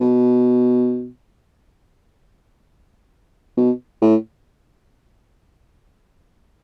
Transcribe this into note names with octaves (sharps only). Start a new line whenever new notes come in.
B2
B2
A2